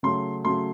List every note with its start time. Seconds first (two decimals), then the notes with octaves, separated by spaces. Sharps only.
0.03 C#3 F#3 A3 C6
0.45 C#3 F#3 A3 C6